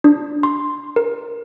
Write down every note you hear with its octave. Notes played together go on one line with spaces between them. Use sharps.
D4
C6
A#4